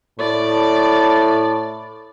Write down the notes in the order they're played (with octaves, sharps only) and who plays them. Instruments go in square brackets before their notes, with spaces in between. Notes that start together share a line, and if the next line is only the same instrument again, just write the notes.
[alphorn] A2 [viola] D5